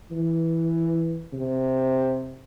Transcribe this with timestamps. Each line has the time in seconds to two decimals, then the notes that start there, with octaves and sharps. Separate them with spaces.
0.11 E3
1.33 C3